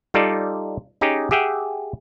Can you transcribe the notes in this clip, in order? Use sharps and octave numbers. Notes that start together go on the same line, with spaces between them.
G3 D#4 F4 A4 D5
C#4 D#4 G4 G#4
G4 G#4 E5 F#5 G5